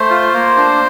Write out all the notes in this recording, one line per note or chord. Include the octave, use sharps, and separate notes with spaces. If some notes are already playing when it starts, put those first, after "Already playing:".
Already playing: A3 C5
F4
A#3
D4